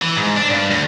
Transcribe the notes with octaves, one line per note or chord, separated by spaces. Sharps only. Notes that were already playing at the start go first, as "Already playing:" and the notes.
E3
G#2
D4
G2
D2